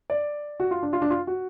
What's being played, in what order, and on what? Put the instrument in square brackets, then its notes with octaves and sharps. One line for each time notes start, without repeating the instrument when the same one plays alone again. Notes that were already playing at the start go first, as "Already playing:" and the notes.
[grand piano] D5
F#4
F4
D4
F4
D4
F4
F#4